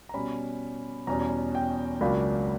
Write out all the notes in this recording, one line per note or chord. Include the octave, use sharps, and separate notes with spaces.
A#5
B2 G3 C#4 B5
E2 B2 G3 C#4 A#5
G5
C#2 C#3 F#3 A#3 D4 B5